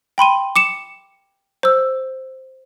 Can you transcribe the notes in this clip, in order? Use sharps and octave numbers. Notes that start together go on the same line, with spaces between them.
G5 B5 C6 D#7
D6 C#7 E7
C5 E6